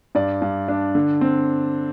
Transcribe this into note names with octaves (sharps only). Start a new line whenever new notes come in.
G2 D5
G2
D4
D3
C4